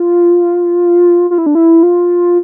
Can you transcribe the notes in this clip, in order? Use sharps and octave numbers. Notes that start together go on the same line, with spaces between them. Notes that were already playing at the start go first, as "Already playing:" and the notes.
Already playing: F4
F4
E4
D4
E4
F4